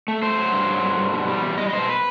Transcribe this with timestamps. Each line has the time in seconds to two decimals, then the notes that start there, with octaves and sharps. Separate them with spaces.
0.08 A3
0.23 A3 C5
0.38 F#3
0.52 G2
0.67 F#3
0.83 G2
0.98 G2
1.13 B2
1.28 G3
1.42 E2
1.58 G3 D#5
1.68 D#5
1.73 B2 C5
1.89 B4